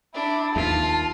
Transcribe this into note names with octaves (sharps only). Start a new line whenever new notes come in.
D4 E4
D#2 F4 A5